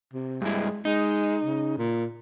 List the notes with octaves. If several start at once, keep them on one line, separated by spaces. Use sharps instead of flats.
C3
G2 G#3 E4
G#3 D#4
C#3
A#2